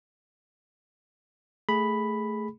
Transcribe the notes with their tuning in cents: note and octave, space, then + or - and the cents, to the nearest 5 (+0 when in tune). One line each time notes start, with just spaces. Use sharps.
A3 +0 G#4 +0 B5 +0